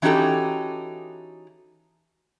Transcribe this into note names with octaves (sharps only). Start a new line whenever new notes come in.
E3 C#4 D#4 F#4 G4 A4